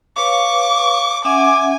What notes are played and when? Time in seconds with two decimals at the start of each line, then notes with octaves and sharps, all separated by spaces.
0.17 B4 C#5 F5 C#6 D6
1.25 C#4 E5 F#5 G#5 D6